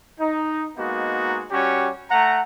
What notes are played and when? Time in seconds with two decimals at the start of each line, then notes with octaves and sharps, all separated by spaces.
0.20 D#4
0.77 G#3 A#3 B3 D#4 F#4
1.51 G3 C#4 F#4 G4 C#5
2.11 A3 F#5 A#5